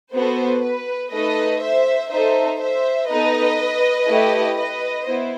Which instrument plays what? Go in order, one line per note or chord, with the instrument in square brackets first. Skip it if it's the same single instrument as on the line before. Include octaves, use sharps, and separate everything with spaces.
[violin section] B3 F#4 A4 C5
B4
A3 D#4 A4 B4 D#5
C5 E5
D#4 A4 C5 E5
C5 E5
B3 D#4 A4 B4 D#5
A3 E4 G4
B4 D#5
B3 E4 C5